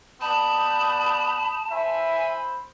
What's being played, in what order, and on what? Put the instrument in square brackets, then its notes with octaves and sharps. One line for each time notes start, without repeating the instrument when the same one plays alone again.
[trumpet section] B3 D5 [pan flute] A5 [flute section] B5 D#6 G6
[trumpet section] E4 C5 B5 [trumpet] E5 [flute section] G#5